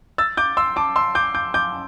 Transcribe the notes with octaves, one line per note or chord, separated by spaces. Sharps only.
E6 A6
D6 G6
C6 E6
A5 D6
C6 E6
D6 G6
D6 G6
D6 G6